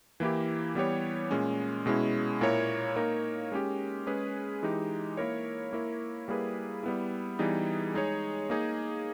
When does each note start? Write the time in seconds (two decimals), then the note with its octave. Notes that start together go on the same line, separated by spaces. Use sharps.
0.20 E3 A#3 E4 G4
0.75 E3 G3 B3 G4 C#5
1.31 A#2 G#3 C#4
1.86 B2 G#3 C#4 E4
2.41 A#2 A#3 E4 A#4 C#5
2.96 A#3 D#4 A#4 C#5
3.52 G#3 C#4 G4
4.07 G#3 C#4 G#4 B4
4.63 E3 G#3 D#4 G4
5.17 A#3 E4 A#4 C#5
5.73 A#3 E4 A#4 C#5
6.28 G3 A#3 E4 G#4 B4
6.83 G3 B3 E4
7.39 E3 G3 B3 D#4 G#4
7.94 G#3 D#4 G#4 C#5
8.50 A#3 D#4 G#4